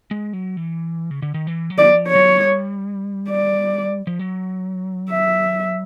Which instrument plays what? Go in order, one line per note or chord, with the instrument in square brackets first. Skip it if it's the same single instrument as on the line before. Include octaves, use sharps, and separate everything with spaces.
[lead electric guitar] G#3
F#3
E3
C#3
D3
D#3
E3
F#3
[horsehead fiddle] D5
[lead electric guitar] F3
[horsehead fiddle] C#5
[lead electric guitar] F#3
G3
[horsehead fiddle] D5
[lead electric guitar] F3
F#3
[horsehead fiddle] E5